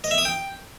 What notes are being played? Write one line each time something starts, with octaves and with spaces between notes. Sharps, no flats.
D#5
E5
D#6
G5